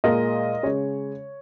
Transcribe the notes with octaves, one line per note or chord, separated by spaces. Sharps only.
A#2 G#3 A#4 D#5
C#3 G#3 C#5